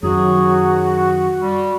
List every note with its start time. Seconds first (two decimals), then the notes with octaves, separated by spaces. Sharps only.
0.03 F#2 D#3 F#3 F#4 G#4
1.40 G3